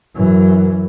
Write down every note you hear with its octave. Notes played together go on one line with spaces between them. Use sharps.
F#2 E3